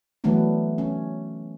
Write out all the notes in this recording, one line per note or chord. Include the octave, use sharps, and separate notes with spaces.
E3 F#3 A3 B3 D4
C#4